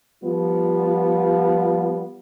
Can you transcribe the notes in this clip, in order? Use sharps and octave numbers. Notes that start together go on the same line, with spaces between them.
F3 G3 B3 F4